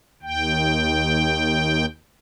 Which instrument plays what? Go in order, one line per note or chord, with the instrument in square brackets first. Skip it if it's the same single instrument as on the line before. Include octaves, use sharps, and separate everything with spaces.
[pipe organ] D#2 G5